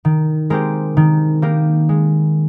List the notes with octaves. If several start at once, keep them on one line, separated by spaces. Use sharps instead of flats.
D#3
G#3 C4 G4 A#4
D#3
A#3 D#4 G4 A#4
G#3